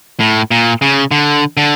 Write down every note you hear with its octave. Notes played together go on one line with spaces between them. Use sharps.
A2
A#2
C#3
D3
D3